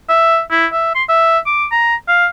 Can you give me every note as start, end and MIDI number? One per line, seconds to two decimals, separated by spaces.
0.09 0.41 76
0.51 0.66 64
0.72 0.95 76
0.95 1.04 84
1.09 1.39 76
1.46 1.66 86
1.71 1.95 82
2.08 2.27 77